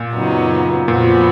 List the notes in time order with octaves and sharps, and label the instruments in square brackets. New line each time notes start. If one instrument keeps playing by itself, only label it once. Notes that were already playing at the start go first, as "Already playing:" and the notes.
Already playing: [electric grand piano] A#2
[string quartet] F#2 C#3 F#3 B3 D#4
[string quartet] F2 F3 B3 F#4 [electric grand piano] A#2